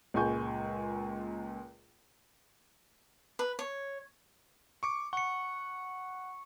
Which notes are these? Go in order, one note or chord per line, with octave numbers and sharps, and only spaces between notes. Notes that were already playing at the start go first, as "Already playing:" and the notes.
C#2 A#2 G#3 G#5 C#6 G6
B4
C#5
C#6 D6 C#7
F#5 C#6 C#7